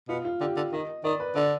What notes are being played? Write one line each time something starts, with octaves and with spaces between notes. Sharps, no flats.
B2 F4
F4
D3 G4
D3
D#3 D#5
D#3 D5
B4
D3 D5